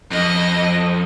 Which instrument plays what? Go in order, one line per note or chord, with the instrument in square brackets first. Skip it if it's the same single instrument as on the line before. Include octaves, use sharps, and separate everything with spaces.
[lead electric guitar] F2 [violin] D#5